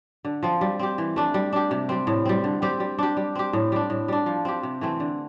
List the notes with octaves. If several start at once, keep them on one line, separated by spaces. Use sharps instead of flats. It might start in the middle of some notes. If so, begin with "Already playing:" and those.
D3
F3 C4
G3
C4 G4
E3
A3 D4
G3
D4 G4
C3
G3 C4
A2
G3 C4
D3
G3 C4 G4
G3
D4 G4
G3
C4 G4
A2
G3 D4
A2
G3 D4
F3
C4 G4
C3
E3 A3 C4
D3